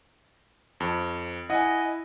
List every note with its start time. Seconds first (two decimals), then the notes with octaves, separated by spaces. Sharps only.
0.80 F2
1.50 E4 D#5 F#5 G#5